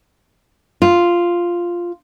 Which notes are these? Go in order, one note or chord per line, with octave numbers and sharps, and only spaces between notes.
F4